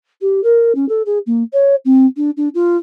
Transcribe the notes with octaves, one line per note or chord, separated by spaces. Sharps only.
G4
A#4
C#4
A4
G#4
A#3
C#5
C4
D4
D4
F4